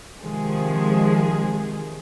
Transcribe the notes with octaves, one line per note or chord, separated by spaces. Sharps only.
C3 D#3 F3 G#3 G#4